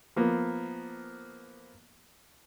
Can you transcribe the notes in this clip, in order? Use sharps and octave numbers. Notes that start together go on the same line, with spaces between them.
F3 A#3 B3